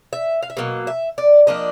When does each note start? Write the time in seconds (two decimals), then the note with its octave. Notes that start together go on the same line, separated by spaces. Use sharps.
0.13 E5
0.42 F5
0.50 E5
0.57 B2 F#3 A#3 D#5
0.87 E5
1.18 D5
1.47 F3 A#3 D4 D#5